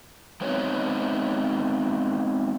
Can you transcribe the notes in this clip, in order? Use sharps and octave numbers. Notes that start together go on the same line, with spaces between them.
G#3 B3 C4 D#4 F#4 C#5